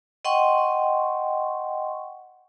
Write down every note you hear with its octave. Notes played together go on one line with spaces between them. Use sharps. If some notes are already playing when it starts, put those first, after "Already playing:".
D#5 F#5 G5 C6 C#6